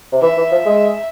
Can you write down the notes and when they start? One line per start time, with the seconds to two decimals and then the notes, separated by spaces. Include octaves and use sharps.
0.12 C3
0.22 E3 E5
0.37 E3
0.51 F3
0.66 G#3